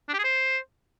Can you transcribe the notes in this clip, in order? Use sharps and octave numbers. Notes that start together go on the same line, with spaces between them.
D4
G4
G#4
C5